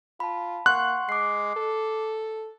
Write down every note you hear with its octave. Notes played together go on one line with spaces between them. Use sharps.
F4 A5 B5
A#3 F#5 C6 C#6 F#6
G#3 D6 C7
A4